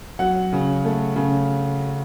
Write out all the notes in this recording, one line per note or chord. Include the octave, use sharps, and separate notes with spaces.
F#3 F#5
C#3
A3
C#3